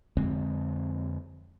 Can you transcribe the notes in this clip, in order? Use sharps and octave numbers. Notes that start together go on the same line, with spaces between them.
F2 D3 G#3 C4